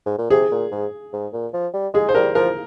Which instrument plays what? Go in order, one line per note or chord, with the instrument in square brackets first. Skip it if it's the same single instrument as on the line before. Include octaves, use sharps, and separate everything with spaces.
[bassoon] G#2
A#2
[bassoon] C3 [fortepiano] G#4
[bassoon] A#2
G#2
G#2
A#2
F3
G3
[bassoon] G#3 [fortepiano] G#4
[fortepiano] C5
[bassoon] G3 [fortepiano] A#4
[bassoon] F3 [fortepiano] A#4